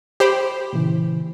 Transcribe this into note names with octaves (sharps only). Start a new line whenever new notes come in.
G4 C5 B5
A#2 C#3 E3